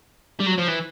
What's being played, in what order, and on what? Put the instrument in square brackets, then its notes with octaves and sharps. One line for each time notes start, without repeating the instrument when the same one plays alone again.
[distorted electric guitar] G3
F#3
F3
E3